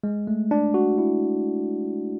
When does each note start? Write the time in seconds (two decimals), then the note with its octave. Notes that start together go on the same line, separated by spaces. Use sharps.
0.04 G#3
0.27 A3
0.51 D4
0.74 F#4
0.98 E4